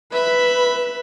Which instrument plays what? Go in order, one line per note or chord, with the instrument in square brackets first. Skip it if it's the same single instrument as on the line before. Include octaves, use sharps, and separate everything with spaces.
[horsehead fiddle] B4 [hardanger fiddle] E5 B5